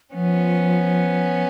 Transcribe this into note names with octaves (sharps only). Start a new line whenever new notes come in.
F3 B3 C#4